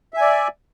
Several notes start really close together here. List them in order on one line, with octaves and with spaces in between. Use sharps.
E5 G#5 D5